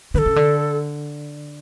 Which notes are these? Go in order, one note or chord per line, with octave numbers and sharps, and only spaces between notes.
D3 A4 B4
C#3
D3